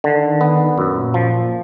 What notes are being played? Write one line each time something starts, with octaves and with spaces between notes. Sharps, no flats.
D3 D#3
B3
F#2 A#2
F3